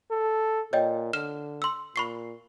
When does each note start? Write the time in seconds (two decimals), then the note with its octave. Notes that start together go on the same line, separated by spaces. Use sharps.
0.11 A4
0.73 A#2 C#5 D#5 G5
1.13 D3 F6 E7
1.62 C6 E6
1.96 A#2 B5 C#6 C7